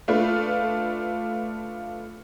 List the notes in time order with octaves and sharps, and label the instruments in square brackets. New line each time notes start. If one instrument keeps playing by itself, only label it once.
[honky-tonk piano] A3 D4 F4 B4